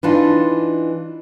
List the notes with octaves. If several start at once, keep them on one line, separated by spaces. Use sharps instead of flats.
E3 D4 D#4 F4